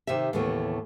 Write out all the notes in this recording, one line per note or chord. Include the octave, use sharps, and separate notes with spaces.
C3 D#3 G4 E5
D#2 A2 C#3 E3 A3 B3